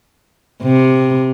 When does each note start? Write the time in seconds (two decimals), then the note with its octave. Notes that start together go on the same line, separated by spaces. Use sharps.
0.63 C3